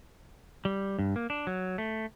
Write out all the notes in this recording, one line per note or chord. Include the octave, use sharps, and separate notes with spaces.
G3
G2
A#3
D4
F#3
A3